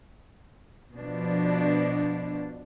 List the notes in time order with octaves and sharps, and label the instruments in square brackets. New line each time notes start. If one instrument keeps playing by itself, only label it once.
[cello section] B2 F3 D4